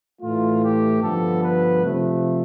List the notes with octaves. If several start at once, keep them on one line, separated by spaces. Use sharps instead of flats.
A2 E3 A3 F4
G4
G2 D3 F3 B3 A4
B4
C3 F3 A3